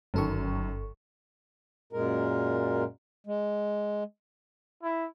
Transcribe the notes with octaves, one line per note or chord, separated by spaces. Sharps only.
G1 F#2 D#3 A4 C#6
F#2 A#2 G#3 A#4
G#3
E4